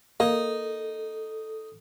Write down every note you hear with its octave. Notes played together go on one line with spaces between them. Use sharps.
A#3 D#4 A4